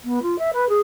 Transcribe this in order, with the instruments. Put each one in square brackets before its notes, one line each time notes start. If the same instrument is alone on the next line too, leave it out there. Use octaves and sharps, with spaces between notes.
[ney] B3
F4
E5
B4
G#4